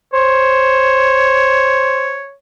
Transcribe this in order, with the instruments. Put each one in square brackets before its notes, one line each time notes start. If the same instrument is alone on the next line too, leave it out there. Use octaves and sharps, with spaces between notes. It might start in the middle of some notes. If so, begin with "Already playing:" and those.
[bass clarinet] C5 [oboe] C#5